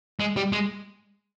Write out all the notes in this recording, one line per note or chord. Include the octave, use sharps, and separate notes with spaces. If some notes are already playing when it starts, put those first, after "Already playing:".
G#3
G3
G#3